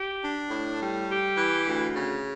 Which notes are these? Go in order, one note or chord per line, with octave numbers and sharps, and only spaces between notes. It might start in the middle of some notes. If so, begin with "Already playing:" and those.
Already playing: G4
D4
A2
G3
G4
E3
D2
C#3